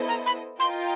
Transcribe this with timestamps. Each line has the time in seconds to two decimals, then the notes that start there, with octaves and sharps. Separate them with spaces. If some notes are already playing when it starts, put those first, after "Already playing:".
Already playing: B3 E4 A4 C5 D#5
0.09 A#5
0.26 B5
0.60 F4 A#4 D#5 G5 C6